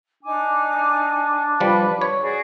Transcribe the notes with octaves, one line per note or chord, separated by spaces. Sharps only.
D4 D#4 G#5 D6
F3 G3 B4
C#5
F#4 G#4 D5